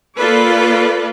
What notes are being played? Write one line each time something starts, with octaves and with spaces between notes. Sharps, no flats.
A#3 F4 A4 B4 D5